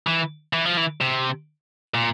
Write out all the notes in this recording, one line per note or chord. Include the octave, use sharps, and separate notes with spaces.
E3
E3
F3
E3
C3
A#2